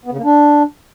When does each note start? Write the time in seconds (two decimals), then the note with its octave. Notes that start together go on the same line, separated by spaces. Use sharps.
0.06 B3
0.12 C#3
0.18 A#3
0.24 D4